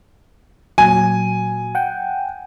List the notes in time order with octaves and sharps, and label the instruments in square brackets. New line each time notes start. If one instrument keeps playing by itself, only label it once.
[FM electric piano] A#2 F#3 [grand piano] G#5
[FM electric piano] F#5 G5